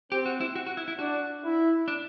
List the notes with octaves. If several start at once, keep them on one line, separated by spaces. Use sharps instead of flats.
C4 G4
F#4
E4
F#4
F#4
E4
E4
D4 F#4
E4
D4